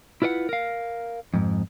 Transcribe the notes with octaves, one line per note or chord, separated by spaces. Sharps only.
E4 F4 B4 D5 F#5
A#4 F5
F2 G#2